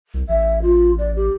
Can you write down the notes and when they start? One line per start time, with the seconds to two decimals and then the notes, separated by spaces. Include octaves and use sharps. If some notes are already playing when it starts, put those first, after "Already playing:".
0.14 C2
0.29 A1 E5
0.62 F4
0.98 D5
1.16 G4